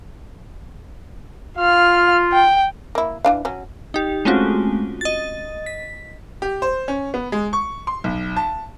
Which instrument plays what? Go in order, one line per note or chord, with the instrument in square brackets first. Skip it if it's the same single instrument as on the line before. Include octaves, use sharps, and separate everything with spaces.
[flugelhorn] F4 [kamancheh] F5 F6
[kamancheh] G5
[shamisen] A#3 E4
E3 D4 F5
F#3 C#4
[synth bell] D#4 G4
G#3 A3 C4 C#4 F4 F#4
D#5 A6
B6
[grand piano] G4
C5
C#4
B3
G#3
C#6
C6
B1
A5